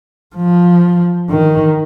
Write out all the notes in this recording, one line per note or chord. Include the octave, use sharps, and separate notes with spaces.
F3
D#3